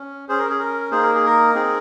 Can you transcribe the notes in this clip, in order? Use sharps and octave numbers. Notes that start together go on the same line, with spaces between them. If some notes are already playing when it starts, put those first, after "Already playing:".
Already playing: C#4
C#4 G#4 C5
A#4
G#4
A#4
A#3 D#4 G#4 C5
A#4
G#4
A#4
C4 D#4 G#4